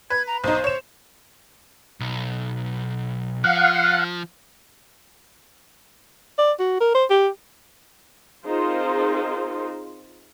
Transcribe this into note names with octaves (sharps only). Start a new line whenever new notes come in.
B4 G#6
A#5
B1 D#4 C5
C#5 E7
B1
F3 F5 F#5
D5
F#4
A#4
C5
G4
C4 D#4 F4 G#4 A#4 C5